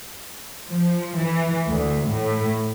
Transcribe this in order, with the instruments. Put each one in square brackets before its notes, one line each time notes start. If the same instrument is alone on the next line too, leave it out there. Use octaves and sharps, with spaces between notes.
[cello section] F3
E3
D2
A2